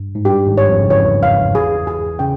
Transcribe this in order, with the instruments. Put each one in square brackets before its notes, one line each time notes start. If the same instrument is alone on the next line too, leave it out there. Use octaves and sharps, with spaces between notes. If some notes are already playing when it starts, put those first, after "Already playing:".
Already playing: [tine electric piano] G2
G#2
[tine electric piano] G2 [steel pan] G4
[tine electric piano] G#1 G#2
[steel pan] C#5
[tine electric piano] F2 F3
C#3
[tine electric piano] E2 E3 [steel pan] C#5
[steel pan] F5
G#4
G#4
[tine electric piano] C#3 [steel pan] G5